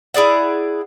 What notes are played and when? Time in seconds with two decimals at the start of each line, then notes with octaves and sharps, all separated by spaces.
0.14 E4 G#4 D5 F#5